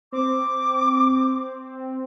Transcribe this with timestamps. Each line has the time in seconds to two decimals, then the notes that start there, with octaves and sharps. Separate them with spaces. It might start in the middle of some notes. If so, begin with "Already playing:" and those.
0.12 C4 D6